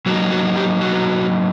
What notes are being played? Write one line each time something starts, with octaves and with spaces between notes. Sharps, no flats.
F#3 A#3 D#4 F#4
F#4
G4
F#4